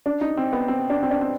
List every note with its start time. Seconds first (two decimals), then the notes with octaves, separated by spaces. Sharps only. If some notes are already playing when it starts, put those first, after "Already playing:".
0.06 D4
0.21 D#4
0.37 C4
0.53 B3
0.68 C4
0.90 D4
1.03 C4
1.11 D4
1.21 C4